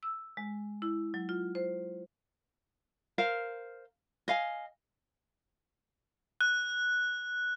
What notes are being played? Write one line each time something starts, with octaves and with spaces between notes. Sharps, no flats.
E6
G#3
E4
F#3
F4
C5
A#4 C5 F5
D#5 F5 G#5
F#6